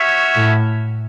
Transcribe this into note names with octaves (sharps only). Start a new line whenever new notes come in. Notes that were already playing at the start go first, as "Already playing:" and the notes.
Already playing: C#4 F#4 C#5 E5
A2